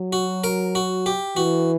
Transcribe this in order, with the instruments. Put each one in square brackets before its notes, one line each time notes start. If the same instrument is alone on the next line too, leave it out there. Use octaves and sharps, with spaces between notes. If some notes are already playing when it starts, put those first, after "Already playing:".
Already playing: [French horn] F#3
[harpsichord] F#4
A#4
F#4
G4
[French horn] E3 [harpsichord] F#4